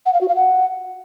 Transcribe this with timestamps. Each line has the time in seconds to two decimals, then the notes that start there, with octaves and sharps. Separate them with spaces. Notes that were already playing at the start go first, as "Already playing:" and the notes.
0.06 F#5
0.13 F5
0.21 F#4
0.28 F5
0.36 F#5